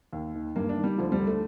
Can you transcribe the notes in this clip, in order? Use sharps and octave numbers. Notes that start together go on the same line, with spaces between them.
D#2
D#3
G2 A#3
D4
D#3
G3
D2 F3
G3
D3
A3